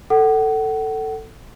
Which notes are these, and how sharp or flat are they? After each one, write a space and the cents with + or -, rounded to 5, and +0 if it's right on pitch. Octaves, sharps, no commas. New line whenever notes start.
A4 +10 F#5 +30